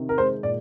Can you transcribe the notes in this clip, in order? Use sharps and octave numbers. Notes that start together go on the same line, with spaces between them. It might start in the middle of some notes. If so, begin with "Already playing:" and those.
Already playing: C3 D#3
A#4
G#3 C5
A#2 D5